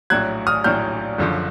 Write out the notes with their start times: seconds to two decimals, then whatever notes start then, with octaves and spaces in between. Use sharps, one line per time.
0.10 A#1 A2 F#3 F#6 G#6
0.47 D#6 F6
0.64 A#1 A2 F#3 F6 G6
1.18 F#1 F#2 D3 F3